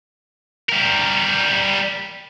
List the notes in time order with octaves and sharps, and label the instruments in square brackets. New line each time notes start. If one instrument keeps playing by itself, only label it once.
[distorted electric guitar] G3 A#4